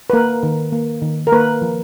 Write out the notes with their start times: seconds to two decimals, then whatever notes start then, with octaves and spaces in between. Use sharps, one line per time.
0.10 B4
0.13 A#3 A#4
0.43 D#3
0.72 A#3
1.02 D#3
1.27 A#4
1.32 A#3 B4
1.62 F3